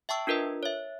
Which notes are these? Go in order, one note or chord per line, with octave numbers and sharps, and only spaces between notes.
E5 G5 A5 C#6 E6
D4 F4 A#4 B4 D#5
C#5 E5